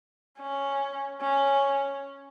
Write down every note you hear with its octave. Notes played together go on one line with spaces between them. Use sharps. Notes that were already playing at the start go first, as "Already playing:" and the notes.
C#4
C#4